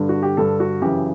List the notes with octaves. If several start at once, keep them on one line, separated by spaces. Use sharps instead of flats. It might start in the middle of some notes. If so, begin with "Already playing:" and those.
Already playing: G2 D3
F#4
G4
G2 D3 A4
F#4
F#2 C#3 E3 G4